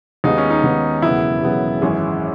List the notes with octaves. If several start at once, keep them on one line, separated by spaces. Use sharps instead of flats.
D#2 D#3 G#3 B3 D#4
C#4
D#4
D#2 D#3 G#3 B3
E1 E2 C#3 F#3 B3 E4
E1 E2 C#3 F#3 B3
G#1 F#2 E3 G#3 C#4